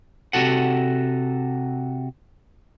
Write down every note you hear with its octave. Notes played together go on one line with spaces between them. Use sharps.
C3 F#4 A4 F#5